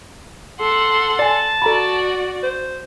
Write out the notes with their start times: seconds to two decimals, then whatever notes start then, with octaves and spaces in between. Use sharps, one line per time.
0.60 A4 F#5 C6
1.19 D5 G#5 A5
1.62 F#4 A4 D5 A#5 B5
2.43 C5